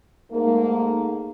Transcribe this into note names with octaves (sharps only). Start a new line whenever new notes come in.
G#2 A3 A#3